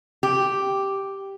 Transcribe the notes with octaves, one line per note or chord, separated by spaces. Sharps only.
G4